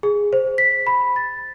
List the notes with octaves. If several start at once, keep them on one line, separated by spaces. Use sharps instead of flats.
G#4
C5
B6
B5
A6